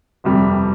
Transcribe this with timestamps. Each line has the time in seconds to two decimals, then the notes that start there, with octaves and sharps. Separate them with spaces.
0.24 G1 F2 C3 G3